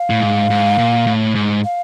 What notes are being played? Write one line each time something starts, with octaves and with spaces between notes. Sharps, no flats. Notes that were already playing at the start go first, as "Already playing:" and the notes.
Already playing: F5
A2
G#2
G#2
A#2
A2
G#2
F5